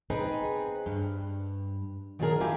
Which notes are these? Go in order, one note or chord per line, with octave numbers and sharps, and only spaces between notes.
C4 D#4 G#4 B4
G2
D#3 F#3 D4 F4 G#4 A#4
F2 E4 F4 G4 G#5